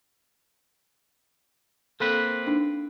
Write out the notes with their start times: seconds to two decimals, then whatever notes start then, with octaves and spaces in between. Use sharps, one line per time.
2.00 A#3 C4 A4 B4
2.47 D4 D#4